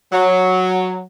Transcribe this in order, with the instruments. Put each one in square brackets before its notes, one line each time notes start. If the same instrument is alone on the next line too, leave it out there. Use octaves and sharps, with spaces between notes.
[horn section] F#3